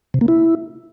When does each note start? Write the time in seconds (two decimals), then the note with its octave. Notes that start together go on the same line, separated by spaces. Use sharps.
0.14 C3
0.21 A#3
0.28 E4